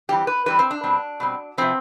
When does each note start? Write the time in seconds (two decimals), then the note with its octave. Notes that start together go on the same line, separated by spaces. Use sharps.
0.09 E3 G3 C4 G4
0.27 B4
0.46 E3 G3 C4 B4
0.59 C4
0.71 D4
0.84 B2 G3 C4
1.20 B2 G3 C4
1.58 C3 F3 B3 C4